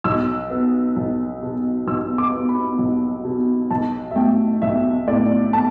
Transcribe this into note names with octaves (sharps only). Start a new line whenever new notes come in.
B1 E6
B3
B1
B2
B1 E6
D6
B3
B5
B1
B2
B1 A5
E5
A3 G5
B1 E5
A2 D5
A5